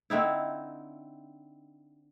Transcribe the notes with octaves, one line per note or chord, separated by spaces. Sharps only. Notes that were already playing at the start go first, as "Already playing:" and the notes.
D3 C4 D#4 E4